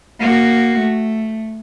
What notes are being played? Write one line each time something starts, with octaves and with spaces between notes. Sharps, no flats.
A#3 F#4
A3